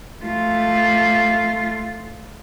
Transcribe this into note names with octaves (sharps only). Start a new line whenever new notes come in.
A3 F4